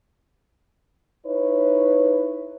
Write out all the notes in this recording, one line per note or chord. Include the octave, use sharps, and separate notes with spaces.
D#4 E4 B4 C#5